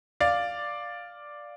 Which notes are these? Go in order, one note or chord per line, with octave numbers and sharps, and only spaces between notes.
D5 F5